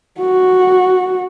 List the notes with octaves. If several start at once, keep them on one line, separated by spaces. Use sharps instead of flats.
F#4